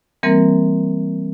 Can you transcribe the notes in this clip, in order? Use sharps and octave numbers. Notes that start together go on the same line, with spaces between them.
E3 G3 A#3 C4 A#4